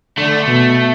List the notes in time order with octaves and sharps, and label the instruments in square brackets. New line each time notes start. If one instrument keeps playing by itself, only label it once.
[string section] D3 [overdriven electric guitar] A3
[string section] B2